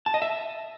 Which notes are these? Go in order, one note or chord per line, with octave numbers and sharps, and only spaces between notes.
A5
D#5
E5